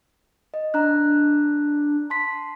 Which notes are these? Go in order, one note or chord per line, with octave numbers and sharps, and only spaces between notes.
D#5
D4 A#5 F#6
A5 C6 B6